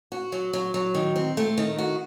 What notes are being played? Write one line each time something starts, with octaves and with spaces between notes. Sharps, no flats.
F#4
F#3
F#3
F#3
D#3
C4
A3
D#3
F#4